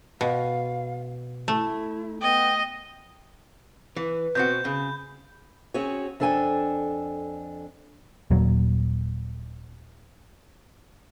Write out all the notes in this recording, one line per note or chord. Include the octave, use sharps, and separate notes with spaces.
B2 F5
A3 E4
B3 D#5 G5
E3 B4
B2 C4 F#4 G6
C#3 B5
C4 C#4 F#4 G#4 C#5
F2 D4 A4 G5 G#5
D#1 A#2 F#3